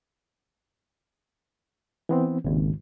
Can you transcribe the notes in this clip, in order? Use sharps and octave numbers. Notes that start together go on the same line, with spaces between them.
E3 B3 C4
G#1 D#2 C#3